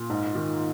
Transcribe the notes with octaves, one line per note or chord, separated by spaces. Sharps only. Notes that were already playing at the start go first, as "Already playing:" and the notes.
Already playing: A#2
G#2
D#3